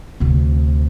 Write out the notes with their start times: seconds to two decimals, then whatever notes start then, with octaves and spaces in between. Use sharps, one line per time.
0.20 D2 C3